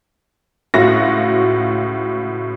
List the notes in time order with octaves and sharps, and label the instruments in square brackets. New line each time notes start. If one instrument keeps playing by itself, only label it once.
[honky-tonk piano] C#2 A2 F4 F#4 A#6